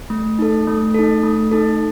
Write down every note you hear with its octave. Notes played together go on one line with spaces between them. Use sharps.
A3
D#4 A4
A3
D#4 A4
A3
D#4 A4